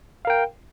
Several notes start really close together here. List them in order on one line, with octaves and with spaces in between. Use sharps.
F5 A#4 G5